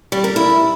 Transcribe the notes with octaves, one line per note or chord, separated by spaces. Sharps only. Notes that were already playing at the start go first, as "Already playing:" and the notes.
G3
A#4
E4